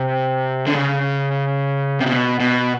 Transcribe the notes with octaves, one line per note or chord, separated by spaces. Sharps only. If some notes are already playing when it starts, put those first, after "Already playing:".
Already playing: C3
D3
C#3
C3
B2
B2